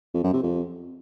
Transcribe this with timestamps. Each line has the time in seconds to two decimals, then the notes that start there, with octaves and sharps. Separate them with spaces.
0.14 F2
0.24 F#2
0.33 C3
0.43 F2